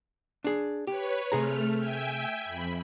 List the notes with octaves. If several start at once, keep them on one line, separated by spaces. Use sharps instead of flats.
D4 G#4
G4 B4 C#5
C3 A3 G#4 A#5 F6
E5 G5 G#5
F2 B5